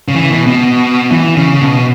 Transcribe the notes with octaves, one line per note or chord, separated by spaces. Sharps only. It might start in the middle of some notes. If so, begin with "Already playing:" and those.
C#3
E3
B2
B2
E3
C#3
B2